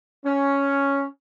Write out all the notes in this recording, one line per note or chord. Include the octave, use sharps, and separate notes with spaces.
C#4